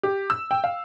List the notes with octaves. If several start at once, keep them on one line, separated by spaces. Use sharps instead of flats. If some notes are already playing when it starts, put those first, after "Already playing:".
G4
E6
G5
F5